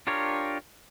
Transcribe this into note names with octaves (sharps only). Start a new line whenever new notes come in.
D4 F4 G4 A#4 C#5